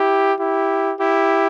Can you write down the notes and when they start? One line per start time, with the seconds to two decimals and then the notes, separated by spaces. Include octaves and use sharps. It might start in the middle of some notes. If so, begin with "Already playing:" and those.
Already playing: E4 G4
0.39 E4 G4
1.00 E4 G4